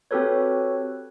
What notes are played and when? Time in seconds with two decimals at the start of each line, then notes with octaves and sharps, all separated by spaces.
0.11 C4 F#4 G4 A4 B4 C#5